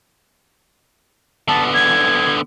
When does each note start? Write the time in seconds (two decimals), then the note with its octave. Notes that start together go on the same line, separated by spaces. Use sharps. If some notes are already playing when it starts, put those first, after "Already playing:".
1.48 D3 B3 A5
1.74 G#6